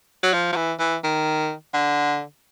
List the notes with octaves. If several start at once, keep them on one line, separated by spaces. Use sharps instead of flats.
F#3
F3
F3
E3
E3
D#3
D3